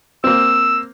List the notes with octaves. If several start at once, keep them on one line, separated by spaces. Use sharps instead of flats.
A#3 C4 E6